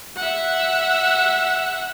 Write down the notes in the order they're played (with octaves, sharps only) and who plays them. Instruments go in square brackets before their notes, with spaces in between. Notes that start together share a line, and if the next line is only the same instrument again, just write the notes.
[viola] E5 F#5